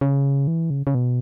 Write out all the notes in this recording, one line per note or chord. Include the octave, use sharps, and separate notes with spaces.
C#3
E3
C#3
C#3
B2